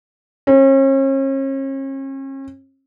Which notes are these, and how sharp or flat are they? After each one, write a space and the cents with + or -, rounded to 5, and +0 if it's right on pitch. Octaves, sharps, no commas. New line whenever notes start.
C#4 -40